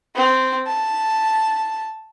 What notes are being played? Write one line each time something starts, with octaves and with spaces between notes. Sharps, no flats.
C4
A5